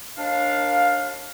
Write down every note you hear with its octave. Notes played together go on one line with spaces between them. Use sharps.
D#2 D4 F5